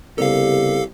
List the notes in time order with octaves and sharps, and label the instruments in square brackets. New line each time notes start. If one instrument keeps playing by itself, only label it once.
[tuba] C2 [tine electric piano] C#3 B3 A#4 [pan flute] G4 [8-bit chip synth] A4 F5